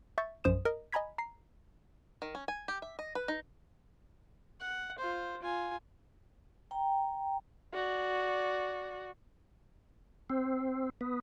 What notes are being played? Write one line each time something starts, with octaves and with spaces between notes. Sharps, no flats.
E5 C#6 G6 A6
A#1 F#2 C5 D#6 E7
A#4 D#5
D#5 G#5 A#5 B5 G#6 B6
A#5 C7
D#3
C#4
G#5
G4
E5
D#5
B4
D#4
F#5
F4 C5
F4 G#5
G5 A#5
F#4 D5
C4
B3